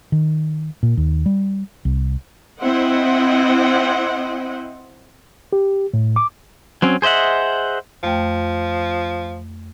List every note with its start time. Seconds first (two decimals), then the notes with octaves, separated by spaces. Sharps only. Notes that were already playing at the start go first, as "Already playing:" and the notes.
0.12 D#3
0.83 A#2
0.97 D#2
1.26 G3
1.85 C2
2.62 C4 E4 C5 D#5 F#5 G5
5.53 G4
5.94 A2
6.16 D6
6.82 F#3 C4 C#4
7.02 G#4 C5 D#5 E5 F#5
8.03 F2 F3 A3 G5